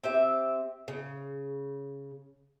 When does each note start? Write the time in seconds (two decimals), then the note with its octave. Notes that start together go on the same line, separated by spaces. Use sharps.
0.04 C4 G4 E5
0.88 C#3